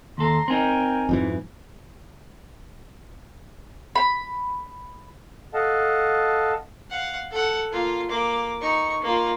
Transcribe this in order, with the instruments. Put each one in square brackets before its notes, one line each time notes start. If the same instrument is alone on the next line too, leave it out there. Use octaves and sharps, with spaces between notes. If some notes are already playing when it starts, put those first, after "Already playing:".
[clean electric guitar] D#2 A4 [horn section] A#5 C6
[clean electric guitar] C4 D#4 [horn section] A#4 G5 G#5
[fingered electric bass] F2 G#2 E3
[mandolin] B5
[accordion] A4 D#5 F5 F#5 A5
[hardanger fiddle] F5 F#5
A4 F#5
A#3 F4
A#3 D6
D#4 C#6
A#3 F4